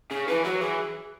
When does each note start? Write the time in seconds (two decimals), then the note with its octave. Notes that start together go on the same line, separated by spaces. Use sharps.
0.11 C#3 G#4
0.27 E3 B4
0.44 F#3 F#4
0.61 E3 G#4